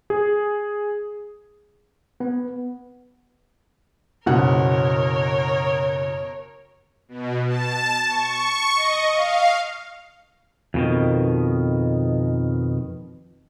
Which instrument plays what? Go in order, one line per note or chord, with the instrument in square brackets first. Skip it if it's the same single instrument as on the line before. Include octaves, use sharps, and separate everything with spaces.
[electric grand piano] G#4
[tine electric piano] B3
[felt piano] F#1 B2 F#5 [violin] A#4 C#5
[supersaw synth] B2
A5
C#6
D#5
F5
[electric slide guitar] F2 B2 D#3